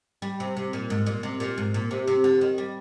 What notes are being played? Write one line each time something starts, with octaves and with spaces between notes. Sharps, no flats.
G3
C3
C3
A#2
G#2
A#2
C3
A#2
G#2
A#2
C3
C3
D3
D#3
G3